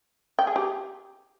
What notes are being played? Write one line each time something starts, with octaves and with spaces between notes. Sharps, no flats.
G5
G#4
G4